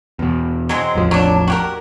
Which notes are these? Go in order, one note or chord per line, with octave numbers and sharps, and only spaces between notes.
E2 B2
F#3 G#3 C4
A1 E2 F3
F#3 D4
F#4 G4 A#4